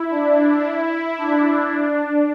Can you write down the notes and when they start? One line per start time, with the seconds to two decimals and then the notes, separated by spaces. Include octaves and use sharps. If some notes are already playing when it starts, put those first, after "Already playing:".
Already playing: E4
0.11 D4
0.65 E4
1.18 D4
1.72 D4